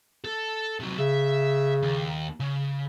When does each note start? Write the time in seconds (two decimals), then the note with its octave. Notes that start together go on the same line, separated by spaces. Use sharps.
0.24 A4
0.80 C3 F#3
0.98 C#3 E5
1.83 D#2
2.40 C#3